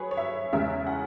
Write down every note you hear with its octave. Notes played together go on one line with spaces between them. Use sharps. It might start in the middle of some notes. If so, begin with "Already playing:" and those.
Already playing: F#3 G#4 B4 C#5
C#5
E5
E2 C#3 G#3 E5
F#5